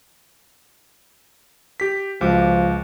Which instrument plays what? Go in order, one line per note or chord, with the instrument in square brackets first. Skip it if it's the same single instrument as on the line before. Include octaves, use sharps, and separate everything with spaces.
[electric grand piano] G4 B6
[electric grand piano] C#2 F#4 D6 [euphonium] F3